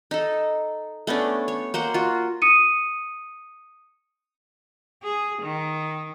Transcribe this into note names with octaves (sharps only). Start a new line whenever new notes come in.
D#4 A4
A3 B3 C#4 D4
C#5
A#3 C5 F#5 G5
F4 F#4
D#6 C#7 D#7
G#4
D#3